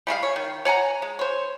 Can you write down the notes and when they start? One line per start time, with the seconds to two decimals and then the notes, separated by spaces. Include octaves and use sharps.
0.07 G3 G#3 F4 F5
0.23 C#5
0.36 D#3
0.65 C#5 F#5 G#5 A#5
1.02 G#3
1.19 C5 C#5